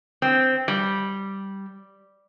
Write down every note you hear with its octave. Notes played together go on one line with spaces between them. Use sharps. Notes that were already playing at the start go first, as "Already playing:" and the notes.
C4
G3